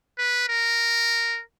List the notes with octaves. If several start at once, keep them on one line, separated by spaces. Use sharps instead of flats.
B4
A#4